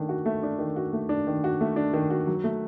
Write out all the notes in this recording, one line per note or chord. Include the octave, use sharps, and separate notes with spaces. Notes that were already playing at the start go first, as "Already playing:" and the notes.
Already playing: D#3 A3 D4
F#4
A3
D4
D#3
F#4
A3
D4
D#3
F#4
A3
D4
D#3
F#4
F#3
A3